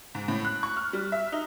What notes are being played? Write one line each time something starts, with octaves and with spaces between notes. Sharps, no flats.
G#2
A2
F#6
C#6
F6
G3
E5
D#4